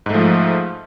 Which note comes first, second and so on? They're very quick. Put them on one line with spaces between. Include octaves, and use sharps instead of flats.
G#2 A3 F3